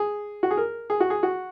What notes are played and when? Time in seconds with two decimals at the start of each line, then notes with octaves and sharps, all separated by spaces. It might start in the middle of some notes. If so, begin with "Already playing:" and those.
Already playing: G#4
0.43 F#4
0.51 G#4
0.57 A#4
0.90 G#4
1.00 F#4
1.10 G#4
1.23 F#4